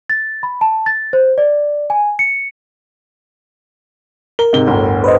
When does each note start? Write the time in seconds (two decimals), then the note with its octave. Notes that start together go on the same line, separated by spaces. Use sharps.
0.10 A6
0.43 B5
0.61 A5
0.86 A6
1.13 C5
1.38 D5
1.90 G#5
2.19 C#7
4.39 A#4 G7
4.53 G#2 C3 G7
4.67 G1 D2 A2
5.04 B4 C5 D#5